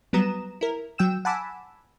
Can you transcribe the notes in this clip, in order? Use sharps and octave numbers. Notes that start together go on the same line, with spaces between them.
F#3 G3 B3 A#5 D#6 E7
E4 A#4
F#3 G5 E6 E7
F#5 G#5 A5 B5 D6 E6